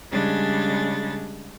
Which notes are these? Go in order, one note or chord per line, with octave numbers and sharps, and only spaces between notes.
C#3 G3 G#3 D4 A6